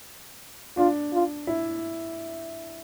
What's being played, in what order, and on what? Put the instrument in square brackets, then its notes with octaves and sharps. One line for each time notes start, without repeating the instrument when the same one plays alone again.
[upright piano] D4 [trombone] F4
[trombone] F4
[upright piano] E4